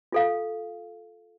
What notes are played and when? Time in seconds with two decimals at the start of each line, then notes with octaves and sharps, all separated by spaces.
0.12 F4 A4 F5